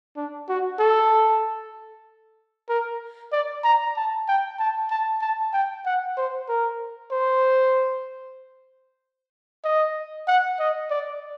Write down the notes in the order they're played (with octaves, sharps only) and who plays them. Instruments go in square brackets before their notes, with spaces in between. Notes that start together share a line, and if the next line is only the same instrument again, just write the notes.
[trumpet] D4
F#4
A4
A#4
D5
A#5
A5
G5
A5
A5
A5
G5
F#5
C5
A#4
C5
D#5
F#5
D#5
D5